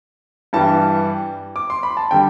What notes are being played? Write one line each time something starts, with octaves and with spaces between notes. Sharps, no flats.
G2 E3 G3 A5
D6
C6
B5
A5
D3 G3 G5